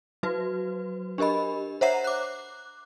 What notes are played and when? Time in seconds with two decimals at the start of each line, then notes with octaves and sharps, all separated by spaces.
0.23 F#3 F#4 B4
1.18 D4 G4 A#4 D#5 B5
1.81 C5 C#5 E5 F#5 A#5 C7
2.04 D6 F#6